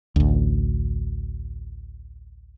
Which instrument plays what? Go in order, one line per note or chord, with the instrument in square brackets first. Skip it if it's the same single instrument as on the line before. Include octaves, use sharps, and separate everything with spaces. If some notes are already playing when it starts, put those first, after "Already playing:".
[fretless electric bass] A1 D2